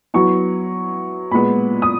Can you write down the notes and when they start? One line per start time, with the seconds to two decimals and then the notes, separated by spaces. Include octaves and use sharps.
0.14 F#3 B3 E4 C#6
1.31 A#2 G#3 B3 B5
1.82 D#6